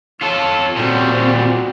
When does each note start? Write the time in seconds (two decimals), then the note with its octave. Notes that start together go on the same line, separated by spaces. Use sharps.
0.22 F4 A4 C#5
0.76 A#2 G3 C4 F#4